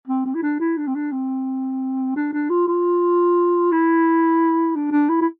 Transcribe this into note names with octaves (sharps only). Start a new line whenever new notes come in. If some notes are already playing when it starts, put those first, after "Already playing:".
C4
C4
E4
D4
E4
D4
C4
D4
C4
D4
D4
F4
F4
E4
D4
D4
E4
E4